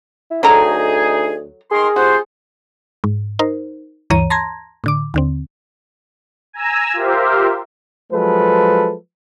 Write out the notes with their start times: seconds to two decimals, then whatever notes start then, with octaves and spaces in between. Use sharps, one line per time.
0.31 E4
0.43 D2 F#3 D#4 G#4 A4 A#5
1.71 D#3 G#4 A#4 C6
1.96 C3 F4 F#4 C5
3.04 G#2
3.39 D#4 A#4 C5
4.10 D2 G2 E3 C#5 A#5 D#7
4.30 A5 A#5 C6 G#6 A#6
4.84 A2 D3 D6
5.14 D#2 D3 C4
6.53 G#5 A#5 E6
6.94 F4 G4 A#4 C5 E5
8.12 F3 F#3 G#3 A4 B4